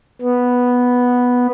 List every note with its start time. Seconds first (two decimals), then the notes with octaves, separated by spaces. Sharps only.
0.22 B3